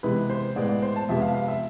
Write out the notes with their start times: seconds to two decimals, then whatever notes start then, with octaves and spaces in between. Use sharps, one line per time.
0.03 C3 E3 G#3 B3 B4
0.30 C5
0.56 A2 G#3 B3 D5
0.69 D5
0.82 C5
0.96 A5
1.09 F2 C3 G#3 B3 E5
1.22 F5
1.34 F5
1.48 E5